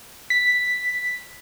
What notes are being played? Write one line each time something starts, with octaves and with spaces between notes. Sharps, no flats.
B6